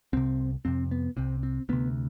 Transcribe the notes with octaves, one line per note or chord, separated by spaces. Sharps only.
C2 C3 C4
F2 C3 C4
B3
C2 C3 C4
C4
D2 C3 B3